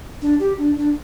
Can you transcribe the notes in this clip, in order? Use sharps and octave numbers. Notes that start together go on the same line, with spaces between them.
D4
G4
D4
D4